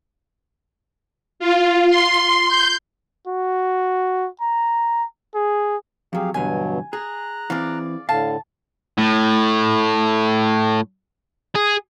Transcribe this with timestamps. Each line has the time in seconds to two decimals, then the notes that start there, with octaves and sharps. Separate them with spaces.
1.40 F4
1.90 C6
2.48 G6
3.28 F#4
4.41 A#5
5.35 G#4
6.13 F2 F#3 G4 G#4 F5
6.34 E2 G2 B2 D3 F#3 G3 G#5
6.93 G#4 A#5 F#6
7.50 E3 C4 G#4 D5 F5
8.09 A2 D3 F5 A5
8.98 A2
11.55 G#4